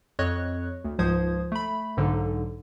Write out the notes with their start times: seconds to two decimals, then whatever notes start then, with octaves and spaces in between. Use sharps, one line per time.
0.19 F2 C#5 D#5 C#6 F#6
0.84 D2
0.99 C#2 G#2 F3 C5 D#6 G#6
1.52 A3 B5
1.97 B1 G#2 D3